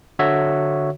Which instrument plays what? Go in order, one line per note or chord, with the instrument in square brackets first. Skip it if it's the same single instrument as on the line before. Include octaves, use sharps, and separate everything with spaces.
[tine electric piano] D3 F#4 C#5 E5